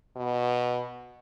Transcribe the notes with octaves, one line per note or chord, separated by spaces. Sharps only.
B2